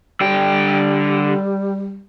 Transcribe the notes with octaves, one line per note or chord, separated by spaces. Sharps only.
D3 G3 G5